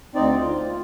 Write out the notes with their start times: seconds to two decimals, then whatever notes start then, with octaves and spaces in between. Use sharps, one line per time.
0.15 D2 C4 D#4 D5
0.40 F4
0.69 A#3